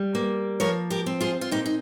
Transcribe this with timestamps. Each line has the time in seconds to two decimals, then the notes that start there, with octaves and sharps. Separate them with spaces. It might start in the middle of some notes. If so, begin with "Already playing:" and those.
Already playing: G3
0.15 A#3
0.60 F3 A#4 C#5
0.90 G4 A#4
1.06 C4
1.21 F4 G#4
1.41 F4
1.51 A#2 D#4 G4
1.66 D#4